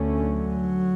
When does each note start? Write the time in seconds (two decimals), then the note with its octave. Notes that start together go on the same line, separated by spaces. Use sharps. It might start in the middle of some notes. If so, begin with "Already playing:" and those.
Already playing: D2 D3 A3 C#4
0.21 F#3